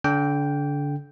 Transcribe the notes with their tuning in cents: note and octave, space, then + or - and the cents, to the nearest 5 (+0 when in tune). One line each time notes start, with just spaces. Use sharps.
D3 -30 G5 +0